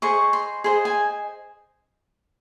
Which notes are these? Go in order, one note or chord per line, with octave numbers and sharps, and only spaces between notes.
G#4 C5 D#5 C#6
C6
G#4 C5 D#5
G#5